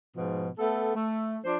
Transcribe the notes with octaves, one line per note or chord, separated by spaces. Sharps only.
G#2 B2 F3
A3 B3 A4
A3
F3 D4 C5